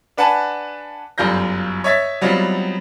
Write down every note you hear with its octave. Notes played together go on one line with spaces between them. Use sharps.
D4 B4 F#5 G#5 A5
G1 F#2 G3 F4 G6 A#6
C#5 D#5 E5 G#6 A6 B6
F#3 G3 B3 C4 D#4 F4